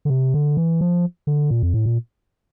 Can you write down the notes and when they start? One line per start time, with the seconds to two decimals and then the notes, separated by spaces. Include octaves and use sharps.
0.05 D3
0.10 C3
0.34 D3
0.57 E3
0.81 F3
1.27 D3
1.50 A#2
1.63 F2
1.74 A2
1.86 A#2